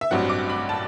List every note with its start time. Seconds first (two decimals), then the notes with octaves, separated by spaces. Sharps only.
0.01 E5
0.11 A1 G2 F#3 C4 F#5
0.29 D6
0.49 B5
0.69 A5